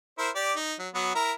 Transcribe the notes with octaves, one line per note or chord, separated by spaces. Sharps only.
E4 A#4 C5
G4 D5
D#4
F#3
F#3 B3 F#4
E4 A#4 A#5